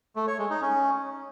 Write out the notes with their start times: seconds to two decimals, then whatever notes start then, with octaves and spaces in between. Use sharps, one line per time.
0.16 A3
0.27 C#5
0.39 G#3
0.50 D#4
0.62 C#4